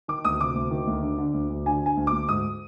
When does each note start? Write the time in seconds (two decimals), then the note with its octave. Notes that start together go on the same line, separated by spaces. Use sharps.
0.08 D#3 D6
0.24 D2 D#6
0.40 C3 D6
0.55 D2
0.71 D#3
0.87 D2
1.02 D3
1.18 D3
1.34 D2
1.50 D2
1.66 D3 G#5
1.81 D3 G#5
1.97 D2
2.07 D6
2.12 D2
2.28 G#2 D#6